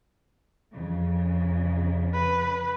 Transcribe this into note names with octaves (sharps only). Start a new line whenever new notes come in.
F2 C#3
B4